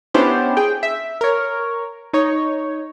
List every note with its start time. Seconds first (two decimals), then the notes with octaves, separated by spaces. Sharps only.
0.14 B3 C#4 D4 E4 G4 C5
0.57 G#4 G5
0.83 E5
1.21 A#4 C#5
2.13 D#4 C#5